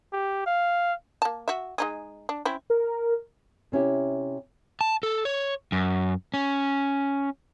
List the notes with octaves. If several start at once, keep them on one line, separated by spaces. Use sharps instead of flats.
G4
F5
A#3 A5
F#4 E5
G#3 D#4 G#4
D4
C4 C#4 E4
A#4
C3 C#4 E4 G4
A5
A4
C#5
F#2
C#4